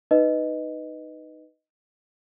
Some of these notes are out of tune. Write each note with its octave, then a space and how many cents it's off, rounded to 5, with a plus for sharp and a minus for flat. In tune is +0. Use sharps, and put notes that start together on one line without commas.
D#4 -5 B4 +0 D#5 +0